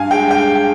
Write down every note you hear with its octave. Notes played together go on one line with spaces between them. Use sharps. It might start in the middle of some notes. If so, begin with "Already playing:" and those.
Already playing: G2 F5 G#5
G#3 G5
G5